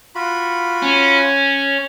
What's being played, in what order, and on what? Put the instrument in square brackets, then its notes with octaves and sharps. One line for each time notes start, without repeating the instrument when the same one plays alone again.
[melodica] F4 F#4 B5
[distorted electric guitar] C#4